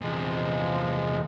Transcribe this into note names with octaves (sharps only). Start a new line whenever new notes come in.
E2 C3 F3 G#3